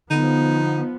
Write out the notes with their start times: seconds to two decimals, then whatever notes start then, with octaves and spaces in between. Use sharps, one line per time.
0.10 D3 F3 B3 D#4